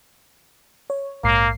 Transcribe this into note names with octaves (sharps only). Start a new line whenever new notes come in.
C#5
A#1 G#2 A#3 C7